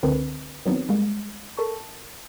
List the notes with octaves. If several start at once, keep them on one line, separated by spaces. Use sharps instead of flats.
C#2 D3 C4 A#4 B4
D#3 F#3 B3 C4 D#4
G3 G#3 A#3
A4 A#4 A5 C#6